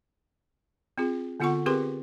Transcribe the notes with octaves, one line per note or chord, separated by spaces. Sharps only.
C4 F4 G#4
D3 B3 F4 A4 F#5 C#6
C4 G4 G#4 A#4 B4 C6